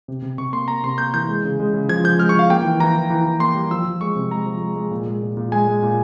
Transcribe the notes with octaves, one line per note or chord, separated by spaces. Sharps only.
C3
C3
C3 C#6
A#3 C6
A#3 A#5
C3 C6
A#3 G6
E3 G6
G#3
C#3
G#3
C#3
F3 G#6
F3 G6
G#3 F6
C#6
F3 F5
A#3 G5
E3
E3 A#5
E3
E3
E3
A#3 C6
G3
F3 E6
F3
G#3 C#6
C3
G#3 A#5
F3
G#3
G#3
A#2
G#3
A#2
A#2
G#3 G#5
G#3
A#2